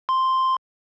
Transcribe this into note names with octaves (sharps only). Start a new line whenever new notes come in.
C6